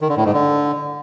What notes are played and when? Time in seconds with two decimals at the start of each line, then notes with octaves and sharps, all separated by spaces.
0.01 D#3
0.09 D3
0.17 A2
0.25 G#2
0.33 D3